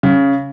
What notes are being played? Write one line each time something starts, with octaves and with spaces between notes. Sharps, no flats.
C#3